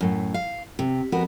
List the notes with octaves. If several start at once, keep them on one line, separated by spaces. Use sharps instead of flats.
F#2 A2
F5
C3
F2 B3 F#4 A#4